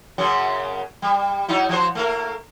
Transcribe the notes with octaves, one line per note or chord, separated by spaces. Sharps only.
F#2 C#3 F#3
G3
F#3 D#4 E4
F3 F#4 C5
A3 A#3 A#4